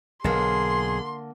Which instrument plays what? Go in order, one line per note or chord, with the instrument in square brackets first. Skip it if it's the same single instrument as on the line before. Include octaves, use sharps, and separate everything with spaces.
[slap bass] B1 [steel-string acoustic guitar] D3 A#3 [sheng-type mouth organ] G#4 [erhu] C6